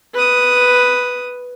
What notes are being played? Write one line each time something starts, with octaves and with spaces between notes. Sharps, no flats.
B4 D#6